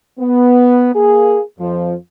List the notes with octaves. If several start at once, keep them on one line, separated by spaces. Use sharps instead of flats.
B3
A#3 G#4
F2 F3